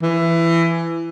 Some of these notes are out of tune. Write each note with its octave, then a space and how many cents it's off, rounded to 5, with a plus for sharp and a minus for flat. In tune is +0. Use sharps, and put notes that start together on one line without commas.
E3 +20